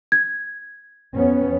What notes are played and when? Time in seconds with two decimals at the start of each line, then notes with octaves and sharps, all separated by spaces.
0.12 G#6
1.15 F2 B3 C#4